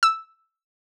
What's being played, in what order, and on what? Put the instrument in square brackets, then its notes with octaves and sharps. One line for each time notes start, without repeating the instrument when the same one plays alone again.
[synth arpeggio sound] E6